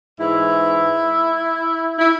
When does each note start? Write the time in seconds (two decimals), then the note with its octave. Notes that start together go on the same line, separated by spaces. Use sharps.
0.20 G#2 E3 E4
1.99 E4